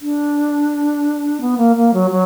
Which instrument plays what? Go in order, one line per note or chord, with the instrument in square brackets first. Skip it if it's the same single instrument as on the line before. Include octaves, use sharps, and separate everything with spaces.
[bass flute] D4
B3
A#3
A#3
F#3
F#3